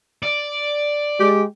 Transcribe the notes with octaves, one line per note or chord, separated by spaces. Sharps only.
D5
G#3 G4